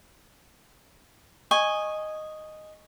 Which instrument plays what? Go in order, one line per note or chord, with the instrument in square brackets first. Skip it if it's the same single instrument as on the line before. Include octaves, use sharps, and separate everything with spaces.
[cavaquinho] D#5 G#5 C#6